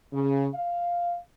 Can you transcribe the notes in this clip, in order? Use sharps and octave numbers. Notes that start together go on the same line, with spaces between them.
C#3
F5